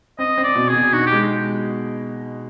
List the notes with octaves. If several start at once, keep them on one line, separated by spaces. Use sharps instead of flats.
C4 D#5
C4
D5
B2
G#4
B2
D#4 F#4
G4
G#3